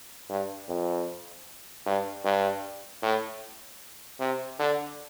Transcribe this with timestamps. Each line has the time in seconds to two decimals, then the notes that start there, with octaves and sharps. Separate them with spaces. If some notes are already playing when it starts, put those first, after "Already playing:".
0.29 G2
0.69 F2
1.86 G2
2.25 G2
3.02 A2
4.20 C3
4.59 D3